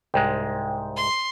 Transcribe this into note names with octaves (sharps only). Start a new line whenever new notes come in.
C2 G#2 G#3 G5
C6